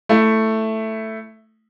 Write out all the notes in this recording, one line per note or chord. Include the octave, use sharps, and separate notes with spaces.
A3 E4